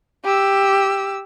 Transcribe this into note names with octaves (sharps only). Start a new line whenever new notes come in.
G4 E6